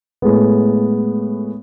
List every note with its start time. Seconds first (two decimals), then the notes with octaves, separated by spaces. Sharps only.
0.22 A2 G#3 B3